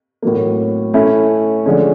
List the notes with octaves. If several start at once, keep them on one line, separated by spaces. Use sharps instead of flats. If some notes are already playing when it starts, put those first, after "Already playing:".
A2 F#3 A#3
A3 C#4 E4
D3 F3 G#3 C#4